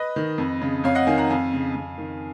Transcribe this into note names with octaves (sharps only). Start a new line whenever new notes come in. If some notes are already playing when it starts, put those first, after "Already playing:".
Already playing: B4 D#5
D#3
F2
C#3
F2 C#5 F5
D#5 F#5
D#3 F5 G#5
F#5 A#5
F2 F5 G#5
C#3
F2
D#3